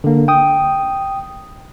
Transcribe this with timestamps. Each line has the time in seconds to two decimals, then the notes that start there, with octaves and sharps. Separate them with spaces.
0.04 D3 A#3
0.28 G5 D#6